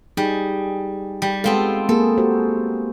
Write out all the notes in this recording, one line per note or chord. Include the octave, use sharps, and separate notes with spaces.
G3 D#4 G#4
G3
G#3 B3 C4 F4 A4
A#3 G#4 A4
F#4 G4 C5